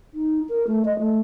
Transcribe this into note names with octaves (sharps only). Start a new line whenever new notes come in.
D#4
A#4
A3
D#5
A3